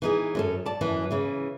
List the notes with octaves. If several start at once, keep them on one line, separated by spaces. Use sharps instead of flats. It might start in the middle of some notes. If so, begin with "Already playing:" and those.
E3 D#4 G#4
F#2 C#4 A4
D5 A5
F#2 E3 F#3
C#3 E3